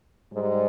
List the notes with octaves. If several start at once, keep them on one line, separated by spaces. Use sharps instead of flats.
G#2 G3